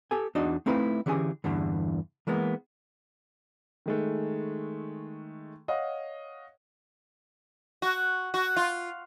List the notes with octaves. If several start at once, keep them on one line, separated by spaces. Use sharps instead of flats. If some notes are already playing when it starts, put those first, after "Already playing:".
G4 A4 G#5
E2 D4 D#4 F#4 D#5
A3 C4 D#4 E4 B4 F5
D3 E3 C#4 G4 G#4 G#5
E2 G2 D3 E3
E3 G#3 A#3 B3
D#3 G#3 A3
C#5 D#5 F5 F#5
F#4
F#4
F4